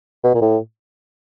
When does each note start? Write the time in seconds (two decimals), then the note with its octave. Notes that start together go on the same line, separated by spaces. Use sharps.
0.24 B2
0.35 A#2
0.42 A2